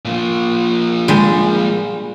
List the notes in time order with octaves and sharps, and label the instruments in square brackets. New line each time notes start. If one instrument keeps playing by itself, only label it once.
[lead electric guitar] A#2 F3
[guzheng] G3 G#3